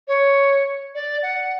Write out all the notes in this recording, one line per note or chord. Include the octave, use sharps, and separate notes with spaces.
C#5
D5
F#5